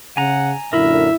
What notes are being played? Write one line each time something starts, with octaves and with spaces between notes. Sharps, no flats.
C#3 F#5 G#5 A#5
F#2 A#2 D3 E4 A#4 E5 B5